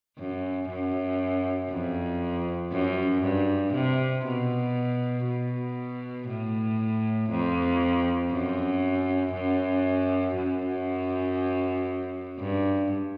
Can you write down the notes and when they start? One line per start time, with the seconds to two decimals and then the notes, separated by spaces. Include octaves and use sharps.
0.18 F#2
0.69 F#2
1.70 F2
2.72 F#2
3.23 G2
3.73 C3
4.24 B2
5.26 B2
6.28 A2
7.30 F2
8.31 F#2
9.33 F#2
10.35 F#2
12.38 G2